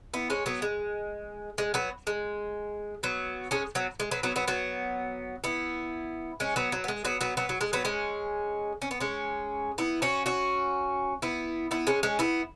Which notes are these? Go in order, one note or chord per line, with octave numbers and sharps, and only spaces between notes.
B3 E4
G#3 C#4
F#3 B3
G#3
G#3
F#3 B3
G#3
F#3 B3
G#3 C#4
F#3 B3
G#3
F#3 B3
F#3 B3
F#3 B3
F#3 B3
B3 E4
G#3 C#4
F#3 B3
F#3
B3
G#3
F#3 B3
F#3 B3
F#3 B3
F#3
G#3
F#3 B3
G#3 C#4
C#4
B3
G#3 C#4
B3 E4
C#4 F#4
C#4 F#4
B3 E4
B3 E4
G#3 C#4
G#3 C#4
B3 E4